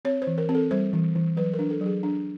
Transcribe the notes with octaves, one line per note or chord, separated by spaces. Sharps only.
C4 C#5
C5
E3
A#4
C4
A4
G3 C5
E3
E3
F#3 B4
A#4
D4
A4
F#3 G#4
D4